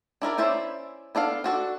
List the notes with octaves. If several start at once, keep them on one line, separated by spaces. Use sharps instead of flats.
D4 E4 A#4 D5
C#4 E4 C5 D5 E5
B3 D4 A4 F5
D4 F#4 A4